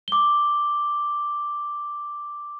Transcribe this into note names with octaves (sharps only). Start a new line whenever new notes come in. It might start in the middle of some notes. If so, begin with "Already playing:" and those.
D6 G7